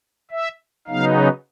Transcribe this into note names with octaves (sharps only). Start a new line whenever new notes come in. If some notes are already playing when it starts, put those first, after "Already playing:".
E5
C#3 F#3 B3 D#4 F5